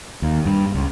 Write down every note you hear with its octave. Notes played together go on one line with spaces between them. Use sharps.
D#2
G2
C#2